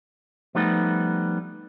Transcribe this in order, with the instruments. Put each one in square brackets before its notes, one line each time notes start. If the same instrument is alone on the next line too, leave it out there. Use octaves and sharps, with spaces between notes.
[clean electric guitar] F3 G3 A3 B3 D#4